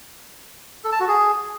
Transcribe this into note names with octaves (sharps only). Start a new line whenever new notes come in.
A4
A5
F#4
G#4